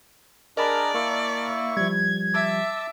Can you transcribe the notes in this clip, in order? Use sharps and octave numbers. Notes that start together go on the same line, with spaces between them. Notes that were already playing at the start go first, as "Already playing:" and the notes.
D4 G#4 A#4 D5 D#5 A5 B5
A#3 E4 E5 C#6
F3 G3 G#6
E5 A5 D6 E6